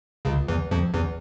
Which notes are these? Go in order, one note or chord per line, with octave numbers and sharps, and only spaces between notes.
C#2 C#3
E2 E3
F2 F3
E2 E3